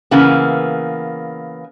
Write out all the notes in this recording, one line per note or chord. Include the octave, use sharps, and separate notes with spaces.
C#3 E3 A#3 B3